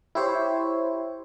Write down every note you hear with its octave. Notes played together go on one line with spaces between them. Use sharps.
E4 G4 C5 C#5